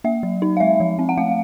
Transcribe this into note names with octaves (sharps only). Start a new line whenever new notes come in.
A#3 E5
F#3
D#4
F5
G#3 E5
F3
C4
F#5
A3 F5